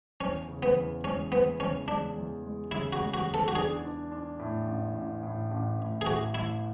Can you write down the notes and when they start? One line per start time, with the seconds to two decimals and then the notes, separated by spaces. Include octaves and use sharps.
0.21 E2 C#4
0.48 C#3
0.63 B3
0.76 E2
1.04 G#3 C#4
1.32 E2 B3
1.60 C#3 C#4
1.88 G#3 D4
2.16 E2
2.43 G#3
2.71 C#3 E4
2.93 F#4
3.00 G#3
3.14 F#4
3.27 E2
3.34 A4
3.48 F#4
3.55 D4 G#4
3.82 D4
4.12 D4
4.39 A2
4.67 A1
4.95 A1
5.23 A2
5.51 A1
5.78 A2
6.01 G#4
6.06 A2 F#4
6.34 A2 E4